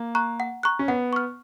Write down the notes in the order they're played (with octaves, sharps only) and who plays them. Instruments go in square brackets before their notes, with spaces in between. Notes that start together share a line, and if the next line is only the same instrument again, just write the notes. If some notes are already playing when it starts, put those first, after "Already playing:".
Already playing: [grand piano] A#3
[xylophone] A#5 C#6 F#6
F#5
A#5 C#6 F#6
[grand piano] C#4
[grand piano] B3 [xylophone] F#5
[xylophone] C#6 F6